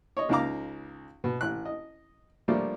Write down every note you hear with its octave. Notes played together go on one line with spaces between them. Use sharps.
C#5 D#5
C#2 C#3 D#4 F5 A#5 D6
B2
A1 F#6
D#5
F3 G3 A3 A#3 D4 F4